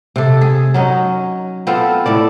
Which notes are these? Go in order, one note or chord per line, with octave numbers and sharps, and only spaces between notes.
C3 A4
G#4
F#3 C#4 D#4
B3 C4 F4 A4
A2 A4 D5